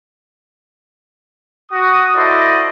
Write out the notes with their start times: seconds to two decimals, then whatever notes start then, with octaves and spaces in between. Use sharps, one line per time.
1.72 F#4 D#6
2.15 E4 F#4 A4 C5 D5 D#5